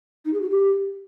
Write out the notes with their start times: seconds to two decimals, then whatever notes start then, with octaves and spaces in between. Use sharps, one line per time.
0.24 D#4
0.33 G#4
0.41 F#4
0.49 G4